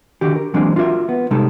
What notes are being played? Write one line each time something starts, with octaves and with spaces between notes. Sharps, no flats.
D3 D#3 F#4 G4
A#4
E3 F#3 G#3 A#3 C4 D4
F4 F#4 A#4 E5
B3
C3 G3 G#3 D#4 A4